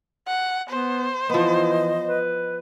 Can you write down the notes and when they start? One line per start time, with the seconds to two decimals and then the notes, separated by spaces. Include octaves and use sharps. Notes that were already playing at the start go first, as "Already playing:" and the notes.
0.27 F#5
0.69 B3 C5
1.30 E3 F3 B3 D#5
2.07 B4